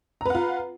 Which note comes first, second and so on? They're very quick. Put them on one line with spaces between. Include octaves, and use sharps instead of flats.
A#5 B4 F#5 F4